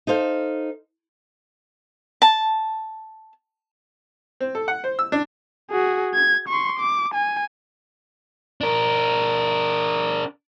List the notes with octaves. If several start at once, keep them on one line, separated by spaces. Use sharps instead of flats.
D#4 A4 C5 F5
A5
C4
A4
F#5
C5
E6
D4
F#4 G#4
G#6
C6 C#6
D6
G#5
D4 A#4